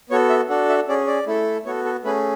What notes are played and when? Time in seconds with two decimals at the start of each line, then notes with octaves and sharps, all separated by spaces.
0.10 B3 F#4 A4 C#5
0.30 E5
0.49 D4 F#4 A4
0.69 E5
0.88 C#4 G#4 D5
1.07 D5
1.27 A3 E4 A4
1.65 B3 F#4 A4 C#5
1.85 A4
2.04 A3 C#4 G#4 B4